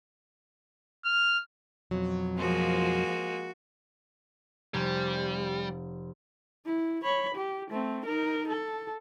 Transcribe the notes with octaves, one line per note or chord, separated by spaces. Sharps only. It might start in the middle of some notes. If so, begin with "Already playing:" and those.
F6
F2 B2 F#3
F3 G#3 A#3 F#4
F1 G3 G#6
E4
C#5 B5
G4
A3 C4
D#4 A#4
A4